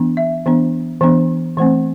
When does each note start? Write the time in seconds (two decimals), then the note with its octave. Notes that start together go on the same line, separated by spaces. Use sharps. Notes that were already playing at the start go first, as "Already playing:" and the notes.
Already playing: E3 B3 D4
0.17 E5
0.46 E3 B3 D4
1.01 E3 B3 D4
1.57 E3 A3 C4 C5